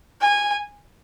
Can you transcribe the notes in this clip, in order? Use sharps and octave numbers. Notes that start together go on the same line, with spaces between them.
G#5